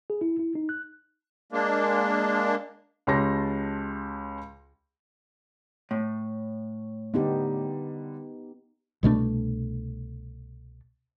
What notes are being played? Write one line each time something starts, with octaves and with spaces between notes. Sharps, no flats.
G#4
E4
E4
D#4
F#6
G#3 A#3 D4
C#2 C#4 G4 A5 C6 A#6
A2
D3 G3 B3 D#4 G4
C2 B2 A3 D4